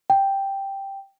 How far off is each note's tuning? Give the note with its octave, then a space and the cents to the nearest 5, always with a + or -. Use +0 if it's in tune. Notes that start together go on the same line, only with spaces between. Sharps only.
G5 +0